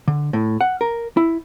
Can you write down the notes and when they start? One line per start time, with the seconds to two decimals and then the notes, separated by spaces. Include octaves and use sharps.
0.08 D3
0.33 A2
0.61 F#5
0.81 A#4
1.17 E4